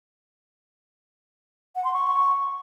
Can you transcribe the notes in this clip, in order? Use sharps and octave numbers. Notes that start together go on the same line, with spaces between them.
F#5
C6
C#6